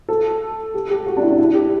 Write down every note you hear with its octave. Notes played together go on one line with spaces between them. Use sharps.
A4
G4
G4
F#4
D4
E4
D4
E4
G4